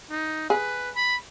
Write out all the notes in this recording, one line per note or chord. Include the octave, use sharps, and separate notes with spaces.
D#4
G#4 B4
B5